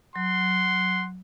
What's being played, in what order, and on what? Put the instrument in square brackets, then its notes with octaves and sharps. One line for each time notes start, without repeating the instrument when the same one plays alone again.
[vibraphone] F#3 [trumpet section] F#5 C6